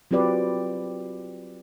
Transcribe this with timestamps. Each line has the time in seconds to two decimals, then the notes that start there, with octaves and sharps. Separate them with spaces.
0.11 F#3 C4 F4 G4 B4 D5